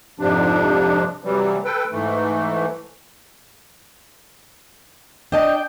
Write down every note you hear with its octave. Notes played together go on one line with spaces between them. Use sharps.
F2 G#2 C3 F3 D4
C3 E3 F#3 G3
A4 B4 G5
G#2 E3 A3
D4 D#5 G5 A5